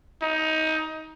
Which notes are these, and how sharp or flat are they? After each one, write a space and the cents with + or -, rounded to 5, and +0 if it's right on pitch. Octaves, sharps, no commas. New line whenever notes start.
D#4 +20